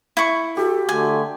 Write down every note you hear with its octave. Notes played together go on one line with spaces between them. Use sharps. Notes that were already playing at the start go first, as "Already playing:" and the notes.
E4 C#6
F#4 G4 A4
D3 A3 G#5